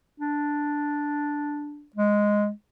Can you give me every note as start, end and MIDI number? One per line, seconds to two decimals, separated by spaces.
0.20 1.87 62
1.96 2.50 56